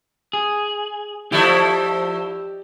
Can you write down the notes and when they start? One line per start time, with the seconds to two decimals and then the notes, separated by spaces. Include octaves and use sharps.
0.33 G#4
1.32 F3 A3 E4 G4 D5 D#5